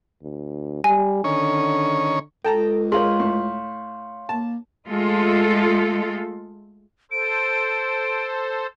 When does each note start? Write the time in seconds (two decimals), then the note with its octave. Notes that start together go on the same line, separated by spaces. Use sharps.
0.23 D2
0.84 G3 G#5
1.24 D3 D#3 C#4 C#5
2.45 C#2 A4 G5 A5 A#5
2.92 G#3 G#4 A#4 C#5 F5 C6
3.20 A2
4.29 A#3 A5
4.86 G#3 A3 F4 A4
7.11 A4 C5 D7